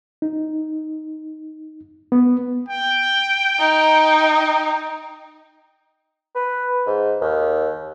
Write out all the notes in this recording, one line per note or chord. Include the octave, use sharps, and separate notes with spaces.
D#4
B3
G5
D#4
B4
G#2
D#2